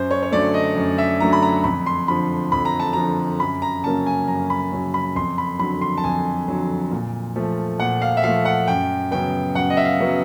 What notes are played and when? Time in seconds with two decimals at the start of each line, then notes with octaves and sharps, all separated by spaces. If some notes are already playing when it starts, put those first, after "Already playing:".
Already playing: F#2 C5
0.11 C#5
0.23 C#5
0.32 D3 F#3 A3 D5
0.54 D#5
0.76 F#2
0.98 E5
1.20 D3 F#3 A3 A#5
1.33 B5
1.42 A#5
1.64 F2 B5
1.86 C6
2.08 D3 F3 B5
2.52 F2 B5
2.65 A#5
2.80 A5
2.93 D3 F3 A#5
3.40 F#2 B5
3.62 A#5
3.83 C#3 F#3 A#3 C#4 A5
4.06 G#5
4.28 F#2 A#5
4.50 B5
4.72 C#3 F#3 A#3 C#4
4.94 B5
5.16 F2 C6
5.38 B5
5.59 D3 F#3 B5
5.81 C6
5.97 A5
6.04 F2 G#5
6.48 D3 F#3
6.91 A#2
7.36 F3 A3
7.80 A#2 F#5
8.02 F5
8.17 E5
8.23 F3 A3 F5
8.45 F#5
8.68 F#2 G5
9.11 C#3 F#3 B3 G5
9.55 F#2 F#5
9.70 D#5
9.77 E5
9.85 F5
10.00 C#3 F#3 B3